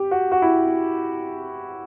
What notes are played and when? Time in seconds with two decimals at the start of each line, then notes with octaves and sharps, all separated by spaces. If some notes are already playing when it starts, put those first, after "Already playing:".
Already playing: G4
0.11 F#4
0.32 F#4
0.42 E4